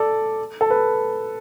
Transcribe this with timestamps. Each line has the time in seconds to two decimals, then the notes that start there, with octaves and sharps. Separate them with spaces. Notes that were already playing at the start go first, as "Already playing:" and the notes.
Already playing: A4 D5
0.61 A4
0.70 B4